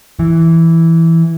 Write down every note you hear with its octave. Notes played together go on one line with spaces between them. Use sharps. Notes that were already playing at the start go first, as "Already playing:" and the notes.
E3